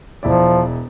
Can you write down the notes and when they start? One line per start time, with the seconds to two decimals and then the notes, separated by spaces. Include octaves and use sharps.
0.23 E1 F3 E4 D5